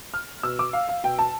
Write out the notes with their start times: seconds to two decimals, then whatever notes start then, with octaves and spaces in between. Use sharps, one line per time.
0.14 F6
0.43 B2 E6
0.59 D6
0.73 F5
0.89 F5
1.03 B2 G5
1.19 A5